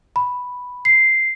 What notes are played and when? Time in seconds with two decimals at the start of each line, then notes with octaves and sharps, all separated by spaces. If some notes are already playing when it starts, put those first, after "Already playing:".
0.16 B5
0.85 C7